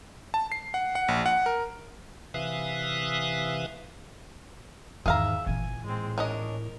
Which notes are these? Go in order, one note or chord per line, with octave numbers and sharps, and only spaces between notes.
A5
C7
F#5
F#5
A#1
F#5
A#4
C3 E3 E5 F5 D#6 F#6
E2 G#2 D#3 G#4 E5 F5 A#5
G1 A#2 E3 G#5
A2 G#3 C4
C#4 D4 A#4 D#5